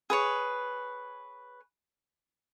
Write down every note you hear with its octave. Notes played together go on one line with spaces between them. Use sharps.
G#4 B4 C#5